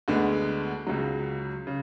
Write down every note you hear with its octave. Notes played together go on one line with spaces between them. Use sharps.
D2 D3 G#3 B3
C#2 C#3 F#3
C#3